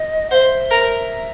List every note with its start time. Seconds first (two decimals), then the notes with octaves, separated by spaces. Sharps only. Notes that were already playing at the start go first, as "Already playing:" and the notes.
Already playing: D#5
0.30 C5 E5 F#5
0.71 A#4